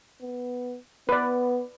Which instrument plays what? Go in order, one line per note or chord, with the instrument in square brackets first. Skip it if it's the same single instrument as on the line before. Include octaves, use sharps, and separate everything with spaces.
[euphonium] B3
[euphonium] B3 [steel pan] B4 D5